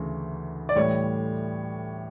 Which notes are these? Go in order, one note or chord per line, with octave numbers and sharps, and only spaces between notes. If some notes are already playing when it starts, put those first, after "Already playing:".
Already playing: D2 C#3 E3
D5
A2 E3 G3 C#5